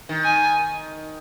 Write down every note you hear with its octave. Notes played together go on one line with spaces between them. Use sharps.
D#3
G#5